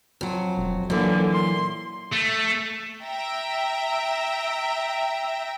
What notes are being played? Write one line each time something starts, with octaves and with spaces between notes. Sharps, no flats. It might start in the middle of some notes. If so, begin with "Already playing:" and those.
F2 F#3
E1
A#2 D3 E3 F#3 A#3
C6
A3
E5 G5 A#5